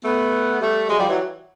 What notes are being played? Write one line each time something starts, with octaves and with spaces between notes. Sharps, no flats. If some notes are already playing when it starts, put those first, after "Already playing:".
A3 B3
G3 A3
F#3 G#3
F3 G3
E3 F#3